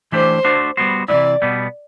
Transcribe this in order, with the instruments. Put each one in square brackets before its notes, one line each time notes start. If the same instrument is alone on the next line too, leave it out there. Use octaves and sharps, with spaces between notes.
[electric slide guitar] E3 A3 D4 G4 [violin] C5
[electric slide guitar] A3 D4 F#4 C5
G3 B3 F#4 C5
[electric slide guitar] C3 E3 G3 B3 E4 [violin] D5
[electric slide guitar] B2 G3 B3